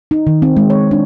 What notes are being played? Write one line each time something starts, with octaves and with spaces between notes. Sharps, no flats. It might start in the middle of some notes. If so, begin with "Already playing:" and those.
D#4
D#3
C4
G#3
C#5
D4